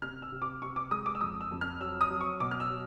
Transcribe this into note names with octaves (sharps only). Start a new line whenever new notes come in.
C3 F6
E6
C3
D6
C3 C#6
D6
G#3 D#6
D6
E6
F2 D#6
E6
F2
F6
F#3 E6
D#6
F#3
C#6
B2 D6
F6
E6
F#3